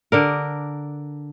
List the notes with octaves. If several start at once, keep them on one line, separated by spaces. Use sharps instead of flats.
D3 D4 A#4